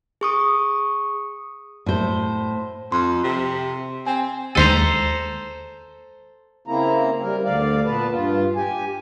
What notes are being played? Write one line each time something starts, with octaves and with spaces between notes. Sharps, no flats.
G#4 C#6 D#6
A2 C5
F2 C6
C3
C4 G#5
D#2 G#3 A4 C5 A#5 D#7
C#3 A#3 C4 E4 A#5
G3 A#4
D2 D3 D5 F5
A#2 B3 B4 A5
G2 F4
G4 G#5